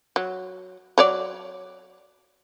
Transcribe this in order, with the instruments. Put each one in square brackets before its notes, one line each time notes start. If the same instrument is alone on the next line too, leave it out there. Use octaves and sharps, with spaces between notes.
[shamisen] F#3
F#3 C#5 D5